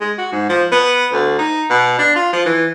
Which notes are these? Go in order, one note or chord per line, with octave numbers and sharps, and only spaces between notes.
G#3
F#4
G#2
F3
B3
D2
D#4
B2
D4
F4
F3
E3